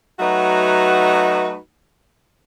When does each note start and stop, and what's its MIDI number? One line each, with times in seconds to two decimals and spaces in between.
0.19 1.56 54
0.19 1.56 57
0.19 1.56 63
0.19 1.56 66
0.19 1.56 71